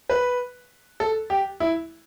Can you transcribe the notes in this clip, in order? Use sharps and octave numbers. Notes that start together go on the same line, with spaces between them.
B4
A4
G4
E4